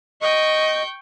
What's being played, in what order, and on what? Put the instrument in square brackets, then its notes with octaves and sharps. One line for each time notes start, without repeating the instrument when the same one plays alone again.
[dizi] D#5 [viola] G5 C#6